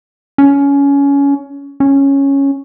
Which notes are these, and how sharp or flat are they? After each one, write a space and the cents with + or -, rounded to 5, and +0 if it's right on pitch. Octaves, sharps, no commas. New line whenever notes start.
C#4 +20
C#4 -5